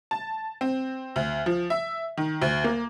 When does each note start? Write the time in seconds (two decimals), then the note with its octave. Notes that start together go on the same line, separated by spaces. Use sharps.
0.11 A5
0.61 C4
1.16 D2
1.46 F3
1.70 E5
2.17 D#3
2.42 D2
2.64 A#3